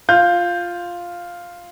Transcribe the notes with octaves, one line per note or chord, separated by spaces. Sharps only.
F4 G6